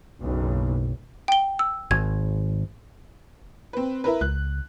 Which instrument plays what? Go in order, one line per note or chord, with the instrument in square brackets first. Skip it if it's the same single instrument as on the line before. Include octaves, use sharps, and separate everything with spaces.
[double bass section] F#1 B1
[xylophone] G5 G7
E6
[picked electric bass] G#1 [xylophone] G#6
[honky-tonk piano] C4 B4
E4 A#4 B4
[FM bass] C#2 [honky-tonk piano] F#6